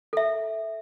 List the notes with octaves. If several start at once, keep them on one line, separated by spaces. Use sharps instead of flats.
A4 E5